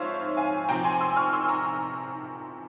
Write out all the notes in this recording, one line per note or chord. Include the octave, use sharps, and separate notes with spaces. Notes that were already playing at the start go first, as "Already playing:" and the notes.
Already playing: G#2 F3 C4 C5 C#5 E5 F5
F5 G#5
C3 F3 C4 G5 A#5
G#5 C6
C6 E6
C#6 F6
C6 E6
A#5 C#6